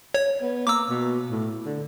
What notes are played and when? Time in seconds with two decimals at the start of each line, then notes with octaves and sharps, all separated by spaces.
0.14 C#5
0.41 B3
0.67 A#3 D6 E6
0.89 B2
1.30 A2
1.65 D3